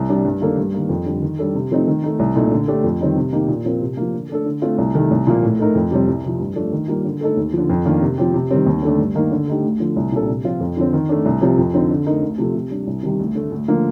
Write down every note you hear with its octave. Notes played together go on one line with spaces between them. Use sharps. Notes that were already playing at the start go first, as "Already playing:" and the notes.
Already playing: C2
C3 G3 D4
G2
D#3 A#3 D4 A4
G2
D#3 A#3
F2
D3 G3
D#3
G3 D4 A4
C3
F3 A3 C4 D#4
D#3
A3 D#4
C2
A#2 A3 D#4
D3
A3 D4 G4
F2
D#3 G3 C4 D#4
C3
D#3 A#3 D#4 G4
A#2
F3 C4 F4 A#4
C3
F3 A#3
D3
A3 D4 A4
D3
A3 C4 F4
C2
C3 D#3 A3
C2
A#2 F3 A#3
A2
A3 D#4 A#4
F2
C3 G3 C4
C2
C3 F3
G2
F3 A3 D4
D#3
G3 A#3 F4
D3
A3 D#4 A4
D#2
D3 F3
F2
D#3 A#3 D4
C3
F3 C4 G4
C3
D#3 G3 C4
D#2
D3 A3 D4
G2
D#3 A#3 D#4 A#4
D3
A3 D#4 G4
D2
D3 F3 A3
C2
A#2 G3 D4 A4
C3
F3 C4 F4
F2
D3 F3 C4
D#3
A3 D4
C2
C3 F3 C4
F2
D3 F3 C4 D#4
D3
A3 D#4 A#4
D2
C3 F3 A3
C3
G3 D4
C2
C3 D#3 G3
D2
D3 A3
D2
D3 F3 A#3